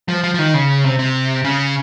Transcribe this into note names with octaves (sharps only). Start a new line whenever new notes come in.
F3
F3
F3
D#3
C#3
C3
C3
C#3